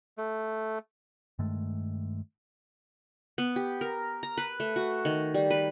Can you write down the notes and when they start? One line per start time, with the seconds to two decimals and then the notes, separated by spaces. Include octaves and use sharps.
0.18 A3
1.39 G2 D#3 G#3 A3
3.38 B3
3.56 G4
3.81 A#4
4.23 A#5
4.38 B4
4.60 A3
4.76 F#4
5.05 D#3
5.34 G3
5.51 B4